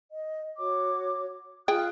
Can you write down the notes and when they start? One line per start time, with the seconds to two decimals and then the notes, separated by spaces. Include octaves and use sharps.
0.10 D#5
0.58 F#4 C#5 D6
1.68 F4 G#4 G5 D#6 F#6